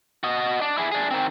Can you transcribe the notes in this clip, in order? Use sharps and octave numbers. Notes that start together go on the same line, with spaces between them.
F#4 D#5
D4
E4 G#4
D4 G#4
D#3 C4